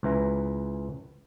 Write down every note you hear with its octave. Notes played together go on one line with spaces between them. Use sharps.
C#2 E3 A#5